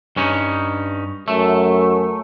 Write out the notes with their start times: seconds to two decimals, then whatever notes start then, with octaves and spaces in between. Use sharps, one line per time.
0.16 G2 C#4 D#4
1.28 F#2 A3